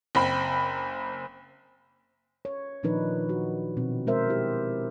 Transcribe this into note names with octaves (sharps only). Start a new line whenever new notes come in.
F#1 C4 B5
C#5
A#2 D#3 F3 D4 D#4 B4
F#4
B2 C4
G#3 C4 A#4 C5 E5
E4 G4